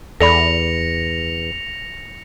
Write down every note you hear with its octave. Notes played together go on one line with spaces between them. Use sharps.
E2 A4 D5 B5 A#6 C#7 F7